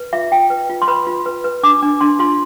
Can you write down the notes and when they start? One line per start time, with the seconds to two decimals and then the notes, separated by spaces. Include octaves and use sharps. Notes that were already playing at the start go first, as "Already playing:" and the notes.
Already playing: B4
0.13 F4 E5
0.32 F4 G5
0.50 B4
0.70 F4
0.82 C6
0.88 B4 B5
1.07 F4
1.26 B4
1.44 B4
1.63 D4 D6
1.82 D4
2.01 D4 C6
2.19 F4 C6